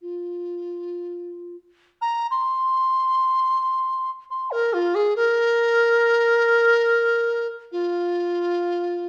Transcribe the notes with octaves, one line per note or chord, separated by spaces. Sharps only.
F4
A#5
C6
C6
A#4
F4
G#4
A#4
F4